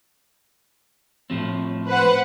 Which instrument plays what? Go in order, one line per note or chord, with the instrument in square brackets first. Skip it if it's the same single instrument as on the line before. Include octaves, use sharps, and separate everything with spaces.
[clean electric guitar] A2 F3 C4
[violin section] B4 C5 F#5